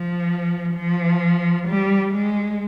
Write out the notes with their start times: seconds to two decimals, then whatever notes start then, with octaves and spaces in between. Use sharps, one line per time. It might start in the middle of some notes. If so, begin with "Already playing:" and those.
Already playing: F3
0.76 F3
1.68 G3
2.15 G#3